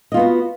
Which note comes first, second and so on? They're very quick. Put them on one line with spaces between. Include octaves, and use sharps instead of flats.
D#5 F4 B3 F#4